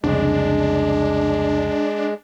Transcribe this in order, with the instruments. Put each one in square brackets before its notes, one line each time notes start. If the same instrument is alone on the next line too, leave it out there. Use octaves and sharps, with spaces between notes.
[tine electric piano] C2 F2 C#3 [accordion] G#3 [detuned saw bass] D4